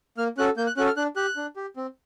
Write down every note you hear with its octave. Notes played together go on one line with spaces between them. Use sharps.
A#3 F6
C#4 F#4 A4 F#6
A#3 G6
F#6
C#4 F#4 A4 F#6
F6
D4 F#6
G4 F#6
D4
G4
C4